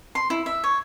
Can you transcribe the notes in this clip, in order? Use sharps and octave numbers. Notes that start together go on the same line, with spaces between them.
C6
E4
E5
C#5